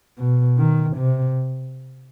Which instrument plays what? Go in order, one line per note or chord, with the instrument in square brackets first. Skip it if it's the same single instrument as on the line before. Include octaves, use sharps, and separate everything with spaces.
[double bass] B2
D#3
C3